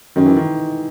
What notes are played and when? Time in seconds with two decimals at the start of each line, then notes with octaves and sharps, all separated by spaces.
0.16 F#2 D#3
0.26 E3
0.37 D#3